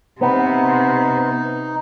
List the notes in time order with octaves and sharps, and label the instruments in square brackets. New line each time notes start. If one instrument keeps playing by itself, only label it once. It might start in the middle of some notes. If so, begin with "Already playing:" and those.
[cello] C3 [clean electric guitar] B3 [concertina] D#4